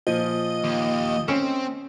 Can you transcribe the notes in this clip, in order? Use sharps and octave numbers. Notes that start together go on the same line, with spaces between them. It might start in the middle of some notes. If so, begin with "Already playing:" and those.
A#2 F3 D#5
D#2
C4 C#4